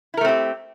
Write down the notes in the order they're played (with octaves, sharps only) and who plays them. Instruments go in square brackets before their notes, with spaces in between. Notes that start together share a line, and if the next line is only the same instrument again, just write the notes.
[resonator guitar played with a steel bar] E4
A#4
A3
C4
G4